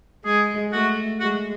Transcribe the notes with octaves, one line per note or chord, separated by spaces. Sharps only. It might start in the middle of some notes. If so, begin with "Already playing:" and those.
G#3 G#4
A3 F#4
G#3 F#4